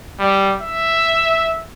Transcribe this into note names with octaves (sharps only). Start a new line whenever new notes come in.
G3
E5